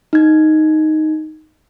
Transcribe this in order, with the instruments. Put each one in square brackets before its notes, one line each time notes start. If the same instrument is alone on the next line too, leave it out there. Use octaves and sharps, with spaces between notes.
[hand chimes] D#4 G#6